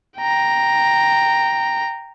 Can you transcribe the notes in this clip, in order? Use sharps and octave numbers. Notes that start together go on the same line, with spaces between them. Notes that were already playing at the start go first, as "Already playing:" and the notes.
G5 A#5